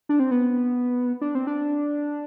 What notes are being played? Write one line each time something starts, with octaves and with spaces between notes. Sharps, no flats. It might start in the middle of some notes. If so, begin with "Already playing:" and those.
D4
C4
B3
D4
C4
D4